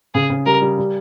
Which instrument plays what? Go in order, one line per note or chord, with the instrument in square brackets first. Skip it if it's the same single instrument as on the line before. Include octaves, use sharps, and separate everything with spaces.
[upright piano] C#3 [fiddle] G#4
[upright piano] C#3
[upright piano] G3 [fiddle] A#4
[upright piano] G3
G3